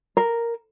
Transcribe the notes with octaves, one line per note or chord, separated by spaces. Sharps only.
A#4